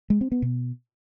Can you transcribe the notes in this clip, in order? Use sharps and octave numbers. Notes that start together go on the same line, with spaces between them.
G#3
C4
B3
B2